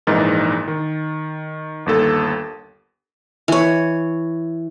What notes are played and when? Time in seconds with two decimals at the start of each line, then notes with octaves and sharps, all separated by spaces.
0.07 A#1 G#2 E3 D#4 A#4 A6
0.68 D#3
1.86 G1 D#2 A4
3.48 E3 C#5